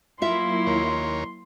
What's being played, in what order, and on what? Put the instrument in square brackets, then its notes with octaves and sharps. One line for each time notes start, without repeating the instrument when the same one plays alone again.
[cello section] F#3 A#3 E4 [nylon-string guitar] F4 E5 [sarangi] C6
[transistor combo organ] D#2 A#4 C#5